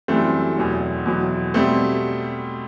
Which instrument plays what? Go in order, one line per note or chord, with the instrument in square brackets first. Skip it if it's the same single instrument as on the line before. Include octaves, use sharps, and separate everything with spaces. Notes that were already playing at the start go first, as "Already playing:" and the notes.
[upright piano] F#2 E3 G3 A3 C4
E2 B2 F#3
E2 B2 F#3
B2 G3 A3 C4